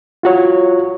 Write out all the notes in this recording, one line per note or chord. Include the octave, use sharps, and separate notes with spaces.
F4 F#4 C#5